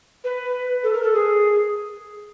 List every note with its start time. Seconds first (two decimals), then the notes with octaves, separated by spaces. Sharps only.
0.24 B4
0.84 A4
0.94 A#4
1.03 A4
1.14 G#4